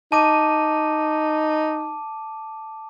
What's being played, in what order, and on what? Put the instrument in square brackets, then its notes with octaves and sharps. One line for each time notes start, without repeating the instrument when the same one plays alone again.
[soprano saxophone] D#4 [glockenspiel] A5 D6 D#7